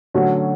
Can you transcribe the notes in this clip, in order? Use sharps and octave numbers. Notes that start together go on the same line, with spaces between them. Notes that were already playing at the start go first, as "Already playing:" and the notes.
D3 F#3 A3 C#4 F#4